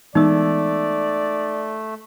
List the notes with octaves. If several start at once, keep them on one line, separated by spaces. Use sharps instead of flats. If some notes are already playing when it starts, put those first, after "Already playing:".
E3 G#3 A3 B3 D#4 D5 E6